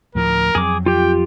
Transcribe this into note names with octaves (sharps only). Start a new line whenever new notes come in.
D2 A2 F3 A#4
F2 F#3 C4 G#4 D6
F4 G4 G5